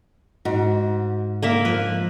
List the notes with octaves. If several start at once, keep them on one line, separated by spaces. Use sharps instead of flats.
G#2 F#4
A#3 A#4 E5
F3 F4 B4